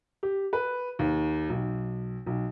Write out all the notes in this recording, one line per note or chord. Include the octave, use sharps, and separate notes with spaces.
G4
B4
D#2
B1
B1